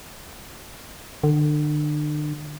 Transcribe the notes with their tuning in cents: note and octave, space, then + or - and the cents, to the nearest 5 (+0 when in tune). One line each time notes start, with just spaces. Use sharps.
D3 +35